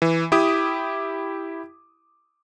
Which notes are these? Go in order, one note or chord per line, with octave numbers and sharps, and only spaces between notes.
E3
E4 G4 D6 D#6